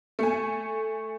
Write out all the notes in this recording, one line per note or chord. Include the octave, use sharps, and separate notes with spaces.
A3 G#5